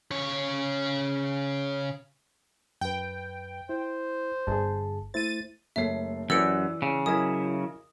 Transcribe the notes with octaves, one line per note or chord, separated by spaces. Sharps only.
C#3 C#5
F#2 B4 G5
E4 C5
G1 G#4 A5
A3 E4 C5 A6 D#7
F#1 A3 C#5 E5 C7
F#2 E3 G4 B4 D5 E6 C#7 D7
C#3
F#3 E4 A#4 D#5 G#5 D#6 G#6